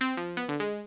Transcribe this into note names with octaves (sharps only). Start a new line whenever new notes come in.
C4
F3
B3
D3
G#3